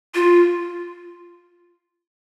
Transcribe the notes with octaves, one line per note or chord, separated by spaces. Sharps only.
F4